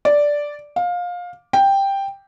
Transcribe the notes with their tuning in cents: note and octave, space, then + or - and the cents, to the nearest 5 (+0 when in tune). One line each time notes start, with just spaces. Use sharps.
D5 -5
F5 +20
G5 +5